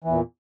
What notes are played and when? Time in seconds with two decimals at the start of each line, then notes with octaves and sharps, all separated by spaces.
0.04 E3
0.08 E2
0.11 A#2